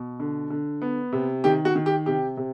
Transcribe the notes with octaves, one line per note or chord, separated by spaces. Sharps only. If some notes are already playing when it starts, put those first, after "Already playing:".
Already playing: B2
D3
D3
B3
C3
D#3 G4
F#4
D#3
G4
C3 G4
C3